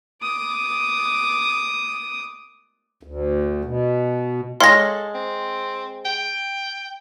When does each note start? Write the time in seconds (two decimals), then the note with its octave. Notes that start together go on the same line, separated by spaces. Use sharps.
0.23 D6 D#6
3.03 D2
3.64 B2
4.61 G#3 A4 C#5 F5 C6 A#6
5.14 C4
6.05 G5